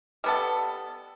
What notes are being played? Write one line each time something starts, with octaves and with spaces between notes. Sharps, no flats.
G3 B3 A4